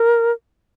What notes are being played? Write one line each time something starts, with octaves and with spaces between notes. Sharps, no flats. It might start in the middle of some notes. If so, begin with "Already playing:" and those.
Already playing: A#4